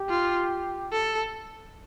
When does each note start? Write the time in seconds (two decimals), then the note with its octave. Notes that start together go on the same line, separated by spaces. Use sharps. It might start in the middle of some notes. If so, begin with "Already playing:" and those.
Already playing: G4
0.09 F4
0.93 A4